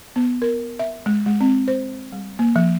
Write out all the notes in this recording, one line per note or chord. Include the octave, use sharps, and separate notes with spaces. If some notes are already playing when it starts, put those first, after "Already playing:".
B3
A#4
E5
G#3
G#3
C4
C5
G3
A#3
F3